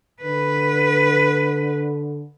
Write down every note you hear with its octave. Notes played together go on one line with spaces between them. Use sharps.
D3 B4